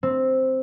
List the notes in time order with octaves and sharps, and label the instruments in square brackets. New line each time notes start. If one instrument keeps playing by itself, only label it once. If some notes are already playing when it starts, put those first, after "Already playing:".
[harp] C4